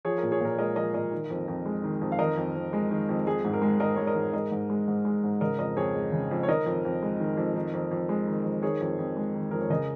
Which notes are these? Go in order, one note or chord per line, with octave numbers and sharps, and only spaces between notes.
F3 G#4 C#5
A#4
A#2
G#4 C#5
A#2 A#4
G#3 A#4 D#5
F3 A#4 D#5
A#2 A#4 D#5
D#3
F2
F2
G#3
D#3
F2
F5
D#3 A#4 D#5
F2
F2
G#3
D#3
F2
G#3 G#4
G#2
A#4
G#3
G#2 A#4 D#5
G#3 C#5
A#4 D#5
G#2
G#3 A#4 D#5
G#2
G#3
G#2
G#3
G#2
C#3 A#4 D#5
F2 A#4 D#5
F2 G#4 C#5
G#3
C#3
F2
C#5
D#3 A#4 D#5
F2
F2
G#3
D#3
F2
D#3
F2
F2
G#3
D#3
F2
D#3 G#4 C#5
F2
F2
G#3
D#3
F2 A#4
C#5
C#3 A#4 D#5